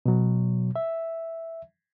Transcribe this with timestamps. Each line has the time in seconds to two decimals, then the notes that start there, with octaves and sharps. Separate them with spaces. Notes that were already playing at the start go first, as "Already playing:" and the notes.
0.06 B2 F#3
0.76 E5